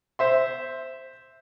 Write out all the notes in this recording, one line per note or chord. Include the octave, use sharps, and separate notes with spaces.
C5 E5 C6